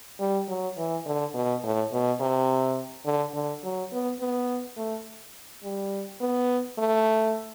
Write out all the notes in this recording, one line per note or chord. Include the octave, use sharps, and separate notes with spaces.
G3
F#3
E3
D3
B2
A2
B2
C3
D3
D3
F#3
B3
B3
A3
G3
B3
A3